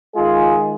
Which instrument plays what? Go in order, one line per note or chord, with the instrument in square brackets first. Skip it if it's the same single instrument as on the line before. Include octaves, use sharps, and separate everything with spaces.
[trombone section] D#3 G#3 F4 G#4